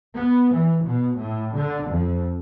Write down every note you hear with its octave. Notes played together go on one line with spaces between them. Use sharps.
B3
E3
B2
A2
D3
F2